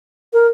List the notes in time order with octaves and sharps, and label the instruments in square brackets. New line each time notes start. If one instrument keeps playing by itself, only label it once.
[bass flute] A#4